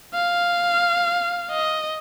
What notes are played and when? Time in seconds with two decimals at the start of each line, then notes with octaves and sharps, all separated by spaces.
0.14 F5
1.51 D#5